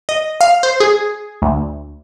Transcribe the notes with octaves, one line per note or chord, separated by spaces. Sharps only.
D#5
F5
C5
G#4
D2